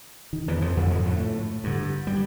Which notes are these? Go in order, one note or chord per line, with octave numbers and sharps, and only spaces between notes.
D#3
E2 E3
F2 F3
F2 D3
G#2 G#3
A2 A3
G2 D3
G3